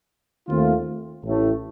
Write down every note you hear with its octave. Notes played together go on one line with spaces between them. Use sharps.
D#2 D#3 A3 C4 F4
A1 A2 A3